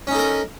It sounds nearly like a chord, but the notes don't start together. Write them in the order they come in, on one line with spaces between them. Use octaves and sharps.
C#4 D#4 A4 A#4